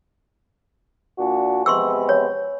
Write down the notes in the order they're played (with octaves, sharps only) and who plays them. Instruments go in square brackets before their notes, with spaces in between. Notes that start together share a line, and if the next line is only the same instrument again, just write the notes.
[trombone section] A#2 D4 F#4
[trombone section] C3 G#3 B3 [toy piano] C6 C#6 E6
[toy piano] C#5